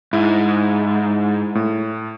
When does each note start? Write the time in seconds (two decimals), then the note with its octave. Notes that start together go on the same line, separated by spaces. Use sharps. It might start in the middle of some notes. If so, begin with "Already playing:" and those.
0.13 G#2 E4
1.55 A2